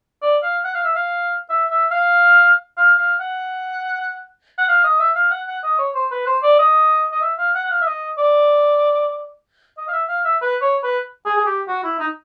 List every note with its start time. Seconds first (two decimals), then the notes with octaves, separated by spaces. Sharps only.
0.22 D5
0.43 F5
0.65 F#5
0.74 F5
0.84 E5
0.95 F5
1.50 E5
1.70 E5
1.91 F5
2.77 F5
2.98 F5
3.20 F#5
4.58 F#5
4.68 F5
4.84 D#5
5.00 E5
5.15 F5
5.31 F#5
5.47 F#5
5.64 D#5
5.79 C#5
5.95 C5
6.11 B4
6.26 C5
6.43 D5
6.59 D#5
7.12 D#5
7.22 E5
7.38 F5
7.55 F#5
7.65 F#5
7.70 F5
7.81 E5
7.86 D#5
8.18 D5
9.78 D#5
9.88 F5
9.92 E5
10.09 F5
10.25 E5
10.41 B4
10.62 C#5
10.83 B4
11.26 G#4
11.37 G#4
11.46 G4
11.68 F#4
11.84 E4
12.00 D#4